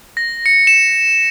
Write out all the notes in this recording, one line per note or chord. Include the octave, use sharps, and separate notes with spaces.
A#6
C#7
E7